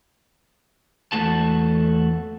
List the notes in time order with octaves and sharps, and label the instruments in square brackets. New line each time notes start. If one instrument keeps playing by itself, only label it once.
[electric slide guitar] E2 A3 F#4 A5